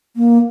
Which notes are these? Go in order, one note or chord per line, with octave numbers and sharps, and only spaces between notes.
A#3